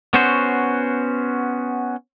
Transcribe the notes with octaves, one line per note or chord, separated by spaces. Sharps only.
B3 C#4 F#4 C5